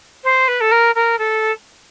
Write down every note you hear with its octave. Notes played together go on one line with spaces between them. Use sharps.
C5
B4
A4
A#4
A#4
A4